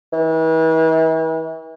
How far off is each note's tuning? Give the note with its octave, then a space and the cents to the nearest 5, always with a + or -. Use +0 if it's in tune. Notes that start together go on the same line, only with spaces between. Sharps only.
E3 -40